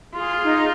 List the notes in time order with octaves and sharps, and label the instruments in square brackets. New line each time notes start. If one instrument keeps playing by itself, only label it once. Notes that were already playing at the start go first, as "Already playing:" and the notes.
[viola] F4 [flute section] G#4
[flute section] D#4